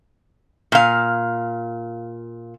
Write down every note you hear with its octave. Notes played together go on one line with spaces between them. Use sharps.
A#2 F5